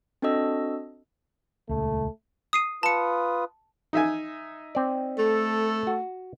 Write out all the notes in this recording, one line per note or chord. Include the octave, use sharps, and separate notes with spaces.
C4 D4 F#4 A4 D#5 E6
D#1 C#2 A3
D#6 C7 D#7
F4 B4 A5 D#6 C#7
D#4 E5 G#5
C4 D5
A3 A4
F#4